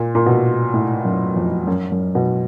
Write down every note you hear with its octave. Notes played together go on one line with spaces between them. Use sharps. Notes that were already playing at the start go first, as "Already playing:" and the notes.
Already playing: A#2
A#2
B2
A2
F#2
F2
F#2
F#2
B2